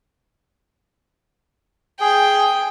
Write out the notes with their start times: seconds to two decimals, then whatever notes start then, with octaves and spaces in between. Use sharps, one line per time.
2.00 G#4 G5